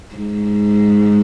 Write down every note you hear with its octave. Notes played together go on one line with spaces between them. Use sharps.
G#2